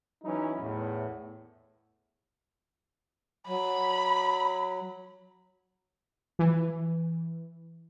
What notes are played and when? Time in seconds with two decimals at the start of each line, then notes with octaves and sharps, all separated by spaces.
0.24 E3 F#3 C#4 D#4 E4
0.60 E2 A2
3.48 F#3 B5
6.39 E3